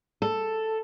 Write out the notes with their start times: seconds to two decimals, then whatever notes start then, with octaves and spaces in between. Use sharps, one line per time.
0.22 A4